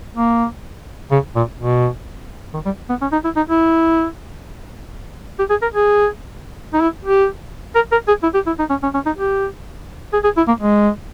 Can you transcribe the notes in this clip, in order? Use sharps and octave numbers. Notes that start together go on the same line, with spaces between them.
A#3
C#3
A#2
B2
D#3
G3
B3
C#4
D#4
E4
D#4
E4
G4
G#4
A#4
G#4
D#4
E4
G4
A#4
A#4
G#4
E4
G4
E4
D#4
C#4
C#4
C#4
D#4
G4
G#4
G#4
E4
A#3
G#3